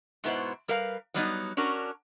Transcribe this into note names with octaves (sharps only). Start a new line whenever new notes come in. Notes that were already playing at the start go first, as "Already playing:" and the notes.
G#2 B2 B3 E4 C5
G3 A#4 B4 F5
F#3 G3 B3 D#4
C#4 D4 F#4 A#4